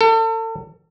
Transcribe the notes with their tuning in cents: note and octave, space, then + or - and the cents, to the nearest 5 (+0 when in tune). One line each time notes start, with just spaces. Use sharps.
A4 +35